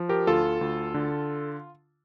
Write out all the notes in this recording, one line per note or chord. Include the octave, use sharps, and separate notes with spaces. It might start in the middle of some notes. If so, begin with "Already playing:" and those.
Already playing: F3
G4 A#4
D2 F4 A4
D2
D3